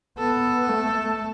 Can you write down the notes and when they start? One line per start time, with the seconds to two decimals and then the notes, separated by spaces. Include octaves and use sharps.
0.18 B3 A4
0.69 A3